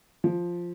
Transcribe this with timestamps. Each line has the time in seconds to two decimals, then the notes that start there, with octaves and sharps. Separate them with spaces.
0.24 F3